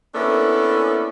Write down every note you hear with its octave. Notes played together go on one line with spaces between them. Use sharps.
A#3 B3 C#4 D4 E4 A4